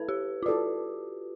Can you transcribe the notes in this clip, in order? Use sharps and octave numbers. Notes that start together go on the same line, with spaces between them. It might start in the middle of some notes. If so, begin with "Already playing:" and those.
Already playing: E4 A4 B4
G4
F4
E4 F#4 A4 D5